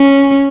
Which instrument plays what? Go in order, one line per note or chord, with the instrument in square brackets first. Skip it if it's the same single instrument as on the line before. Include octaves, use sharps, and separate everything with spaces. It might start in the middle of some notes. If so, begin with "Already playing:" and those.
Already playing: [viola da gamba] C#4